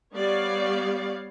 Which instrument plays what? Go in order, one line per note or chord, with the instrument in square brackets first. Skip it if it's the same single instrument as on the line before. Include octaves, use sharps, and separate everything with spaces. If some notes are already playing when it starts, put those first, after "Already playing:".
[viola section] G3 B3 C#5 D5 F5